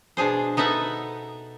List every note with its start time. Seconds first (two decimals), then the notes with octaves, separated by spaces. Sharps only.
0.17 B2 D4 G#4 C5
0.57 B3 D#4 A4 E5 F#5